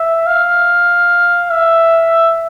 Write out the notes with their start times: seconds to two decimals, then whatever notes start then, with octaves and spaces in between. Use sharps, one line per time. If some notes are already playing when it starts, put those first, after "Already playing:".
Already playing: E5
0.26 F5
1.51 E5